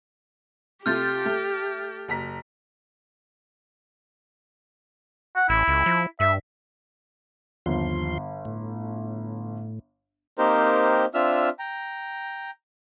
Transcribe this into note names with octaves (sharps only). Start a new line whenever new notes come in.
C3 A3 F4 G4 F6 G6 A6
A3
F#1 A#5 B6
F#5
A1 E4
C#2
F3
G2 E5
G1 D#2 F3 C6
A2
A#3 C4 D#4 G4 A#4 C5
C4 D4 F4 E5 E6 F6
G5 A#5